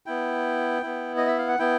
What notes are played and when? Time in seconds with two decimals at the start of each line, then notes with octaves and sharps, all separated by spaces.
0.06 B3 E4 G5
0.82 B3 E4
1.17 D#5
1.27 E5
1.38 F5
1.48 F#5
1.59 B3 E4 G5